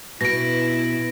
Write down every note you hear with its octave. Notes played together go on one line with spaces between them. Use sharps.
B2 E4 A#6 D7